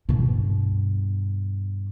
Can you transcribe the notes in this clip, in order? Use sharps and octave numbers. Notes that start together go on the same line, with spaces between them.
G2 B2